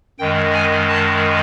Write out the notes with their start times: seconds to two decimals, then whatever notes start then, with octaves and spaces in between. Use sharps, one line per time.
0.19 F#2 D#3 G#3 G5
0.54 G#5
0.89 A5